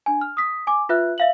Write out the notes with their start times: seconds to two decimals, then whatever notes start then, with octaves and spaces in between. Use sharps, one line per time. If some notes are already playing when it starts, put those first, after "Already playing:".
0.06 D4 G#5
0.21 F6
0.37 D#6 B6
0.67 G#5 D6
0.89 F4 B4 E5 F#6
1.18 E5 F5 F#7